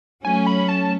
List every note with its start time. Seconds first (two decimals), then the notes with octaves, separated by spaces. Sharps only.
0.24 F#3 A3 C#4 G#5
0.47 B5
0.69 A5